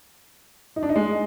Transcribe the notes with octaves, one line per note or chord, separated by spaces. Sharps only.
D#4
D4
D#4
G#3